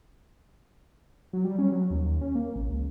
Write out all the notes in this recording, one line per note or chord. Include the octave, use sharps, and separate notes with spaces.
F#3
G3
C#4
F#3
D#2
D#2
C#4
A#3
A1
C#2